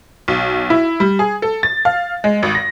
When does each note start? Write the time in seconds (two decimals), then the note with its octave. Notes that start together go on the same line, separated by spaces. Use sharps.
0.28 B1
0.70 E4
1.00 G3
1.19 G#4
1.42 A4
1.63 A6
1.85 F5
2.24 G#3
2.43 G#1
2.55 A#6